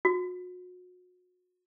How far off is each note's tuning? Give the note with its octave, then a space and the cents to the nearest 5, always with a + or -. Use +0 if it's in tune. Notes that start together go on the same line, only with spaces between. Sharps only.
F#4 -35